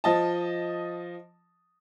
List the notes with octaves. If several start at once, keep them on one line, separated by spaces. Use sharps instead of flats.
F3 D#5 A5